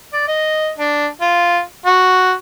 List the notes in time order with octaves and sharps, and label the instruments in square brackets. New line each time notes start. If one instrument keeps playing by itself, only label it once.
[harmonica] D5
D#5
D4
F4
F#4